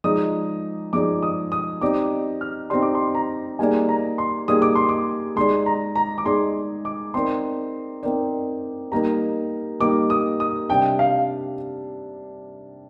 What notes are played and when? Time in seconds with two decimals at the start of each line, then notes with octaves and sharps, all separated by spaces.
0.04 F3 G#3 D#4 G#4 D5 D#6
0.93 F3 G#3 D#4 G#4 D5 D6
1.23 D#6
1.52 D#6
1.81 C4 D#4 G4 D5 D6
2.41 F6
2.70 C4 D#4 G4 D5 C6
2.82 D6
2.95 C6
3.15 A#5
3.59 G3 A#3 D#4 G#4 D5 G#5
3.89 A#5
4.18 C6
4.48 G3 A#3 D#4 G#4 D5 D#6
4.62 D6
4.75 C6
4.89 D6
5.36 G#3 D#4 G#4 D5 C6
5.66 A#5
5.95 A#5
6.18 D6
6.25 G#3 D#4 G#4 D5 C6
6.85 D6
7.14 C4 D#4 A#4 D5 C6
8.03 C4 D#4 A#4 D5
8.92 G3 A#3 D#4 A#4 A#5
9.80 G3 A#3 D#4 A#4 D6
10.10 D#6
10.40 D#6
10.69 C3 G3 D4 G5
10.99 F5